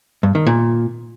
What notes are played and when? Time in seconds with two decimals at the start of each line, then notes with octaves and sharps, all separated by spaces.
0.23 G2
0.35 D#3
0.47 A#2